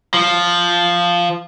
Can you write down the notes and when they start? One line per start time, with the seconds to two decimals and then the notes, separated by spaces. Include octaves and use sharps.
0.14 F3